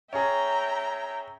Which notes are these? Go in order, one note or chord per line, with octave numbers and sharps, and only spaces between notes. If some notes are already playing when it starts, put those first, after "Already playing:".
C#4 G#4 E5 G5 A#5